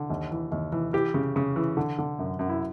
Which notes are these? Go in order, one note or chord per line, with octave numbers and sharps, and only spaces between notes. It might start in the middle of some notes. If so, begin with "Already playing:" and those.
Already playing: D3
D#2
E3
D#2
E3
E3 G4
C#3
C#3
E3
D3
D3
F#2
F#2
E4